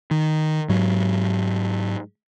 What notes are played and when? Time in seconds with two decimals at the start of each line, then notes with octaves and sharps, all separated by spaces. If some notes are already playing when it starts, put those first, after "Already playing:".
0.11 D#3
0.69 G#2 F#3